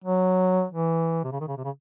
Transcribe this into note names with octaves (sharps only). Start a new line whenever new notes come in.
F#3
E3
C3
C#3
D#3
C#3
C3
C#3